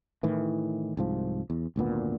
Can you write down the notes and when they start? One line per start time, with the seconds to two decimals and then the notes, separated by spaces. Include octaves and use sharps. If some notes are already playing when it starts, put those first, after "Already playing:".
0.23 A2 D#3 E3
0.97 C2 G#2 F3
1.50 E2
1.76 G#1 D2 A#2 B3